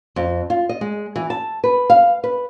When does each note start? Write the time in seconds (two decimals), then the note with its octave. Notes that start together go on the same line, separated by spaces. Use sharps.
0.16 F2
0.50 F4
0.69 D#5
0.81 G#3
1.16 E3
1.30 A5
1.64 B4
1.90 F5
2.24 B4